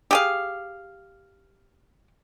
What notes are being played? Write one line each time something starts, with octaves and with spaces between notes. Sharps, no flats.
G4 G#4 F5